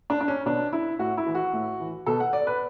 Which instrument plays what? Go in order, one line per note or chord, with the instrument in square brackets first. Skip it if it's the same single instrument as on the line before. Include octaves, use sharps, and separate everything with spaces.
[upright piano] D4
D4
C#4
B2 D4
E4
A2 F#4
E4
E3
F#4
A2
E3
B2 A4
F#5
D5
B4